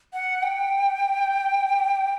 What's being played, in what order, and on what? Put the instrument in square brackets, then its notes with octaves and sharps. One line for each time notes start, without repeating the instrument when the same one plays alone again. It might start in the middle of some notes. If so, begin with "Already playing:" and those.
[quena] F#5
G5